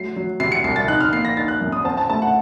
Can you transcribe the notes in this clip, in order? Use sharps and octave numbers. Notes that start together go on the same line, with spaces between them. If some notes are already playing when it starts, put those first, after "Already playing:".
Already playing: F#3 A3 C7
F#3
C3 C7
C#7
C2 C7
A6
D#4 F#6
F6
A#3 C7
A#6
D#4 A6
F#6
F#2
D#6
C4 A5
A5
A3 A5
F#5